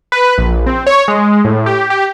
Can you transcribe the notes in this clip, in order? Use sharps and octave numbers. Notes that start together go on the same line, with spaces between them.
B4
A#1
C4
C#5
G#3
A2
G4
G4